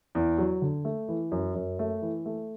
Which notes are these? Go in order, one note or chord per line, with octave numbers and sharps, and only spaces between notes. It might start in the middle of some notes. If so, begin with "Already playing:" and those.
E2
F#3
D3
A3
E3
F#2
F#2
A3
E3
A3